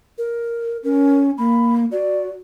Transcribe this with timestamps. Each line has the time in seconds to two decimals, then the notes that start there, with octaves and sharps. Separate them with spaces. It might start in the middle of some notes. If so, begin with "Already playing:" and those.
0.18 A#4
0.84 C#4 A#4
1.38 A#3 B5
1.92 F#4 D5